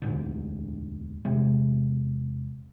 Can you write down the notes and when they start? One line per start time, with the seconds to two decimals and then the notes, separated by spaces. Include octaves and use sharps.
0.02 E1 D2 G#2 D3
1.25 E1 C3 G#3